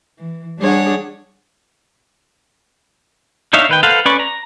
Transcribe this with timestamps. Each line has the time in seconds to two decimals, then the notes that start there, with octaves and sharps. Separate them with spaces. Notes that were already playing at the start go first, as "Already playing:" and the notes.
0.19 E3
0.58 G3 D4 G#4 C#5 F#5
3.53 D4 D#4 C#5 E5 F5
3.69 D#3 B4 G5
3.83 A4 B4 C5 F5 F#5
4.05 C#4 B4 D5 B5 C#6
4.20 A#5